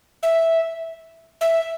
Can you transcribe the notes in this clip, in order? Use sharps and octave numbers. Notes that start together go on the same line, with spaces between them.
E5
E5